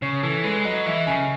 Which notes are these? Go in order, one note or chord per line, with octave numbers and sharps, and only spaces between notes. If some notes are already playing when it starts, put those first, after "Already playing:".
C#3 C#5
E3 A4
G#3 B4
F#3 D#5
E3 E5
C#3 G#5